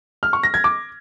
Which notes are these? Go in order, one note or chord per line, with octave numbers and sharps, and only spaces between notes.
F6
C#6
A#6
G#6
D6